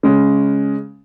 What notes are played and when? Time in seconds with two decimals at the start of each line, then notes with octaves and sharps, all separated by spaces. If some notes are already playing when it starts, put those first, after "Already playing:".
0.03 C#3 G#3 C#4